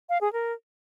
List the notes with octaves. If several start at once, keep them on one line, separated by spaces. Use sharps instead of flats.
F5
G#4
A#4